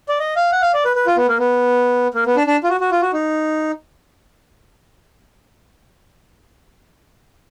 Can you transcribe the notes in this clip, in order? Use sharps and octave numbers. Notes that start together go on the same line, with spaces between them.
D5
D#5
F5
F#5
F5
D5
B4
B4
F4
B3
A#3
B3
A#3
B3
D4
D4
F4
F#4
F#4
F4
F#4
D#4